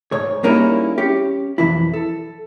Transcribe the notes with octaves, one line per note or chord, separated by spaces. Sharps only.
G#2 C#5
G3 G#3 A#3 C#4 D#4 E4
C#4 G4
B1 F2 E3 E4
A4